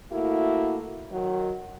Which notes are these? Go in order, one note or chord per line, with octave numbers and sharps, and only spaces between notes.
A3 A#3 E4 F#4
D#3 F#3